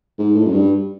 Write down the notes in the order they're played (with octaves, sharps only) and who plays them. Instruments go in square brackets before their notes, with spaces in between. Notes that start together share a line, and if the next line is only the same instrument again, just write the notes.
[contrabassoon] G#2
A2
F#2
G2